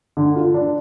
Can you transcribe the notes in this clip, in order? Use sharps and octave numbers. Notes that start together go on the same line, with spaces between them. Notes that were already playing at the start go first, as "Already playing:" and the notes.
D3
F4
D4